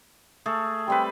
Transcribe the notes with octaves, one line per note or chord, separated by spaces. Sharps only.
A3 G#4 A4
G3 C4 B4 G5